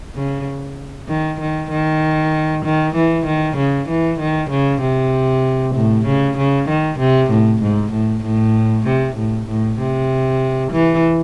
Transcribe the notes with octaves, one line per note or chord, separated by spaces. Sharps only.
C#3
D#3
D#3
D#3
D#3
E3
D#3
C#3
E3
D#3
C#3
C3
A2
C#3
C#3
D#3
C3
A2
G#2
A2
A2
C3
A2
A2
C3
E3